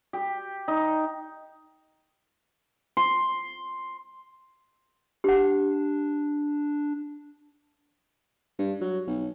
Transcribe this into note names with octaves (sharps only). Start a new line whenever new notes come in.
G4
D#4
C6
D4 G4 F#5
G2
F#3
B1